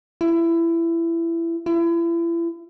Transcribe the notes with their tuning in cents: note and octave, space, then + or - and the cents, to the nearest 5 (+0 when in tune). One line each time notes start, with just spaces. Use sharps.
E4 +20
E4 +35